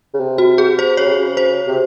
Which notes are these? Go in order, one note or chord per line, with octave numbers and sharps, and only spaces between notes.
C#3
C3
F#4
G#4
C5
C#3 C#5
C3
C#3
C5
C3